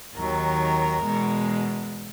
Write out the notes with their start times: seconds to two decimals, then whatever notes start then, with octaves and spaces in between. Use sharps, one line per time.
0.15 D#2 D#3 F#3 A#4
1.02 E2 B2 G#3